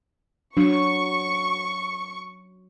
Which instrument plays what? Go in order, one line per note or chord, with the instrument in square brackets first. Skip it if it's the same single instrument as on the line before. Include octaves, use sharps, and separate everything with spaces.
[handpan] F#3 [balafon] D4 [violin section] C#6